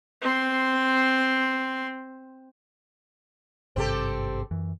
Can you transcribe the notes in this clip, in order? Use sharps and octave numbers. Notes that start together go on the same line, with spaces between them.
C4 C6
G#1 G2 C3 C4 G4 A4
F#2 E3